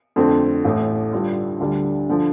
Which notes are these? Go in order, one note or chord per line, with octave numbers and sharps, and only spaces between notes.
F2 D3 A3 C4
A1 A2 A3
G2 D3 G3 F4
D2 D3 G3
D3 F3